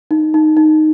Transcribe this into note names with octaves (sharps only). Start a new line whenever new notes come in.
D#4
D#4
D#4